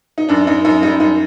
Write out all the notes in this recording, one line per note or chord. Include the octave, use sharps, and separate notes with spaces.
D#4
F#2 D4
F#2 D#4
F#2 D#4
G3 D#4
F#2 D#4